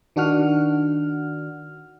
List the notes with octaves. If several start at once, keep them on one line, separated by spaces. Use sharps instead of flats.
D#3 D4 F#4 F#5 F6